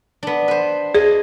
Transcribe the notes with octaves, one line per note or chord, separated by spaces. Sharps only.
B3 D4
B4 C5
G#4 D#5